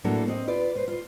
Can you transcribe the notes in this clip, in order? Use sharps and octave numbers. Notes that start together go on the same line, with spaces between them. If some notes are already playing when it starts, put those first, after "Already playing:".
A2 F#3 A#3 D4 F#4 A4
C4 D#5
F4 B4 D5
B4 C5
F4